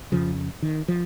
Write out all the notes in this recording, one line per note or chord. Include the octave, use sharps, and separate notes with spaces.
F2 C#3 F3
D#3
F3